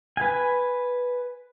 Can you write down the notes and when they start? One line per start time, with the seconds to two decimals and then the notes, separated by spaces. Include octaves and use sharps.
0.17 B4 G#5